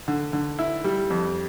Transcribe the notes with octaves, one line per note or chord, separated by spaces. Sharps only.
D3
D3
E4
G3
F2